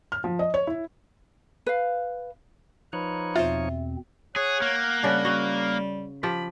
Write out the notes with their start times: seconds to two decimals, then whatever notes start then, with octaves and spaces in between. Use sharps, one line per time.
0.12 F6
0.24 F3
0.39 D#5
0.54 C#5
0.67 E4
1.66 B4 F5
2.93 F3 D#4 B4 C#5 A#5 B5
3.36 E2 B2 C4 F4 C5 E5
4.36 G#4 C#5 F#5
4.62 A#3
5.03 C#3 G3 D4
5.25 F#4 D#5
6.23 F3 F4 G4 B5